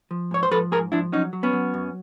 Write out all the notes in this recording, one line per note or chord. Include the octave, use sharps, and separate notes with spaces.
F3
G#2 C#5
C5
F3 A4 B4
G#2 G#4 A#4
F3 D4 E4
F#3 C#4 D#4
F#3
B3 C#4
F#3
F#2